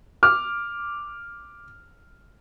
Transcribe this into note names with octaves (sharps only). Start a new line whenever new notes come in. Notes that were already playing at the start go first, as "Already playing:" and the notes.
D6 F6